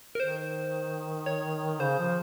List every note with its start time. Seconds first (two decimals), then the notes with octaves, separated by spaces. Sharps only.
0.15 A#4
0.20 D#3 C5
1.26 C#5
1.80 C#3 C5
1.98 F3